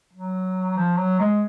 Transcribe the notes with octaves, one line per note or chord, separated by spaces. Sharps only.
F#3
F3
F#3
G#3